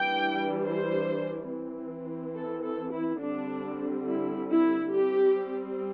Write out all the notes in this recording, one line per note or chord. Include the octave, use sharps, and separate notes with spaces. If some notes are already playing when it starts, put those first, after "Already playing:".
Already playing: E3 G3 D4 G5
C5
E3 C4
A4
A4
E4
D3 G3 C4 D4
E4
E4
G3 C4 G4